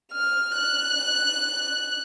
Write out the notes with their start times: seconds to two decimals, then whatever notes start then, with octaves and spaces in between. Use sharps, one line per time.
0.13 F6
0.57 F#6